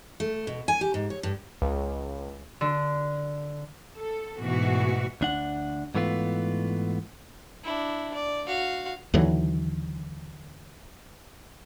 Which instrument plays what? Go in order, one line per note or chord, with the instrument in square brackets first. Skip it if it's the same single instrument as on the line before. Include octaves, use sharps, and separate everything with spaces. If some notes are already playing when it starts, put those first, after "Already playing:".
[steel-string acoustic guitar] A3
B2
G#5
G4
G#2
C#5
G2
[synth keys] C#2
[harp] D3
[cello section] A4
G#2 B2 E3 A3 B3 F#4
[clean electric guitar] D2 D4 F#5
G#2 E3 A3 B3 F4
[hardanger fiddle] D4 E4
D5
F#4 F5
[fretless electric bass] D#2 D3 E3 F#3